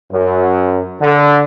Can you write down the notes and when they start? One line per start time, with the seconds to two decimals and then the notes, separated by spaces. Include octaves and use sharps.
0.11 F#2
1.01 D3